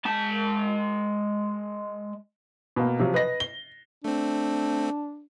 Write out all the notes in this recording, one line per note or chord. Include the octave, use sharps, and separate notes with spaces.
G#3 A5
B2 A#3
C3 F3 F#3
B4 D#5 A#6
G7
A3 C4 D4